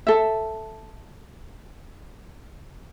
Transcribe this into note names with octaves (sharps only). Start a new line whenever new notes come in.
A4 E5